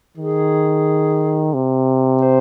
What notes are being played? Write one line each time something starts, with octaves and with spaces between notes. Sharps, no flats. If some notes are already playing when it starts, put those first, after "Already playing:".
D#3 G#4
C3
C5